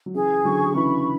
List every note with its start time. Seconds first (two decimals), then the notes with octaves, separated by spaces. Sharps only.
0.06 F#3
0.14 C#3 E3 G#4
0.44 D3 F#3 C#6
0.74 C#3 E3 B5